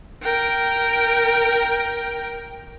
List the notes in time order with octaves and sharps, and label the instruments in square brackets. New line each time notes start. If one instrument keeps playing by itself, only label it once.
[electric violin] A#4 G5